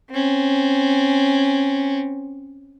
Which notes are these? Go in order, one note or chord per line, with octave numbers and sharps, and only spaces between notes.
C4 C#4